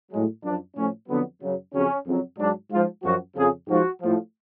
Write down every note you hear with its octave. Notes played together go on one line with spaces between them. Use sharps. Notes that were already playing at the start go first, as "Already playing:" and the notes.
A2 F#3 G#3
F#2 F3 D4
A2 F3 C#4
F2 D3 F#3 B3
F#2 C#3 F#3
F2 C#3 F#3 C#4
F2 C#3 F#3
G#2 F#3 D4
G#2 F3 F4
F#2 F3 F#4
F2 C#3 F3 G#4
G#2 F3 F#4
A2 F3